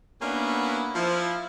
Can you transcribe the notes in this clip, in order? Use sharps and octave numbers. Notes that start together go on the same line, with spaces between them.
A#3 B3 C#4 D4 E4 F#4
F3 E4